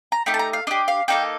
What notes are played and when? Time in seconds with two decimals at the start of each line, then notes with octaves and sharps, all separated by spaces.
0.12 A#5
0.26 A3 D#4 G4 G5
0.34 A5
0.39 A#5
0.53 F5
0.67 D4 G4 D#5
0.88 F5
1.08 A#3 D#4 A4 G5